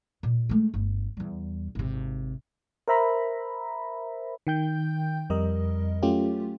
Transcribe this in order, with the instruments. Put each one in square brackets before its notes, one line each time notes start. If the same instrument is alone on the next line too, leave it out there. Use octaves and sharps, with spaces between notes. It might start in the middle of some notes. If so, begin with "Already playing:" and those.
[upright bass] A#2
G#3 A3
G1
E2 G3
G#1 C3
[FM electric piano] A#4 C5 E5 A#5 B5
D#3 G5 G6
F2 G3 A#4 D#5
F#3 A3 C#4 F4 G4